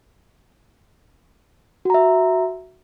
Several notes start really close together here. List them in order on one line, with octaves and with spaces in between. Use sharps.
F#4 A#5 E5